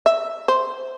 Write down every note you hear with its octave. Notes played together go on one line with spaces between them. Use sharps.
E5
C5